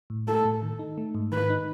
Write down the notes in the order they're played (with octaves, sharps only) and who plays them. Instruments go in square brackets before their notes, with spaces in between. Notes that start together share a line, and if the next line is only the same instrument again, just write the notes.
[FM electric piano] A2
[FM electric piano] A3 [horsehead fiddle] A4
[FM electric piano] A2
D#3
D#4
A3
G#2
[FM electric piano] D#3 [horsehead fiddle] B4
[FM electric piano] D#4